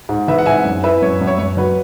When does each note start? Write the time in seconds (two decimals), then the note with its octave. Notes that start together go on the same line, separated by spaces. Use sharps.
0.09 G#2
0.28 E3 B4 E5
0.38 F#5
0.46 G#2 E5 G#5
0.65 F#2
0.84 E4 B4 E5
1.02 F#2 C#5
1.21 F#2
1.27 C#5
1.38 F#2 C#5
1.57 F#3 B4